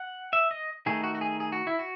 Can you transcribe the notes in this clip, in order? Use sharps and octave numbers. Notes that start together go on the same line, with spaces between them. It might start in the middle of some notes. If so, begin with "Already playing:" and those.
Already playing: F#5
E5
D#5
D#3 A3 D#4 G#4
F#4
F#4
G#4
G#4
F#4
E4
F#4